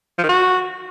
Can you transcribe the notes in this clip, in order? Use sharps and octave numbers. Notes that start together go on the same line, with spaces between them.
F3
D#3
F#4